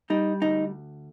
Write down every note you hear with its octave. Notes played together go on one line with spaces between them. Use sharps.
G3 D#4
D2 D#4